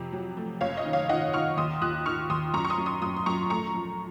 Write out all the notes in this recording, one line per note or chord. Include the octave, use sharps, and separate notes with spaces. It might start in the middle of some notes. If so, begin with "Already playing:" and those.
Already playing: F2 C3
F#3
A3
F#1 C#5 F5
D#5
D#3
C#5 F5
D#3 D#5 F#5
D#3 C#6 F6
D#2 C6 D#6
D#2 D#6 F#6
D#3 C#6 F6
D#2 C6 D#6
F#2 A#5 C#6
C#6
C6 D#6
F#2
C6 D#6
F#2 C6 D#6
C6
F#2 A#5 C#6
A3 A#5 C#6
F3